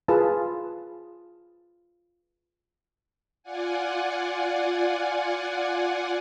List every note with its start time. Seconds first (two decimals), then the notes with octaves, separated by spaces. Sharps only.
0.08 F4 G#4 B4 A5
3.43 F4 D5 F#5 G#5